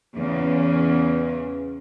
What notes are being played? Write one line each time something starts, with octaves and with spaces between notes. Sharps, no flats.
E2 C#3